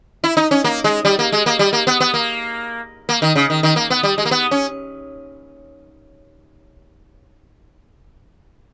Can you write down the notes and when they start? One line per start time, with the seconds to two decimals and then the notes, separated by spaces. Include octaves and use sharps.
0.24 E4
0.37 D#4
0.51 C#4
0.64 A#3
0.84 G#3
1.05 G3
1.19 A#3
1.32 G#3
1.46 A#3
1.59 G3
1.73 A#3
1.87 B3
2.00 B3
2.14 A#3
3.09 A#3
3.22 D#3
3.35 C#3
3.50 D#3
3.63 D#3
3.76 A#3
3.90 B3
4.03 G3
4.18 G#3
4.25 A#3
4.31 B3
4.51 C#4